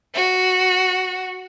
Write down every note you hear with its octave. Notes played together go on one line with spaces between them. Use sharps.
F#4